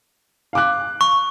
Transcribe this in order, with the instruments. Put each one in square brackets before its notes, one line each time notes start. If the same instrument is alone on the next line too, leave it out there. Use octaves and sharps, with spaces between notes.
[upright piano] F5 D6 F#6
[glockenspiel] C#6